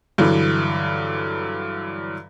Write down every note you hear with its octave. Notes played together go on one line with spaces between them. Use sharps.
G2 D3 E3 F#3